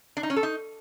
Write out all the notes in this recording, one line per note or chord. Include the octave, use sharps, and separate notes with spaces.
D4
D#4
C#4
A4
D#4